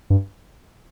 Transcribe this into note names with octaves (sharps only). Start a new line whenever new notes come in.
G2